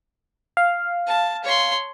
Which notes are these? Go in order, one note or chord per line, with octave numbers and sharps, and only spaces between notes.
F5
A5
C#5 C6